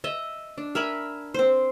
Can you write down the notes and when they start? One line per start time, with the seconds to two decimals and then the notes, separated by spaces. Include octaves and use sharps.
0.04 D#5 E5
0.58 D4
0.75 A#4 E5 G#5 B5
1.34 C4 C5